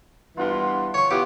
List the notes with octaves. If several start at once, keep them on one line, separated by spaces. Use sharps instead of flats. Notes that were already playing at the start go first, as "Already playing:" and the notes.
G2 E3 B3 F4 F#5 C6
C#5 C#6
B3 E4 F4 G4